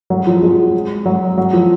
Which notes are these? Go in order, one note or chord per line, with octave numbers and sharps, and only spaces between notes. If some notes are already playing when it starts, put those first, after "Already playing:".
F#3
F3
G#3
F#3
F#3
F3